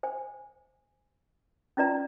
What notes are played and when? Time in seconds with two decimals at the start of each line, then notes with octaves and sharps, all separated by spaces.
0.03 C5 G#5
1.77 C#4 D#4 F4 B4 D5 A#5